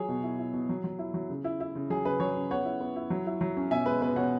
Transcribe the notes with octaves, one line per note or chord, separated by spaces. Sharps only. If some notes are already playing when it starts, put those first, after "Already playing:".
Already playing: F#3 G#4 C#5
B2
E4
E4
B2
F#3
F#3
E4
F#3
C#3
E4
E4
C#3
F#3 G#4
C#3 B4
F#3 G#4 C#5
C#3
B3 C#5 F#5
E4
B3
E4
F#3
E4
F#3
C#4
B2 E5 G#5
G#3 B4
B2 B4
B2 C#5 F#5